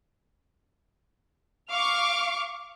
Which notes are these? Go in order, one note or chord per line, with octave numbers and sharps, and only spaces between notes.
F5 C#6 D6 F6